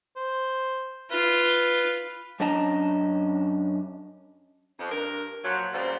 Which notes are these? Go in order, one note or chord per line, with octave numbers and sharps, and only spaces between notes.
C5
F4 B4
F#2 C#4 D4 D#5 A5 A#5
F2
G2 A#4
A#2 F3 F#3
F#2 A#2 C#3 G3 C4